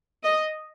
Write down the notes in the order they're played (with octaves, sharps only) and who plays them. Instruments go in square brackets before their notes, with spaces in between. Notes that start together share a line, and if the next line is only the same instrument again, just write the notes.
[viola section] D#5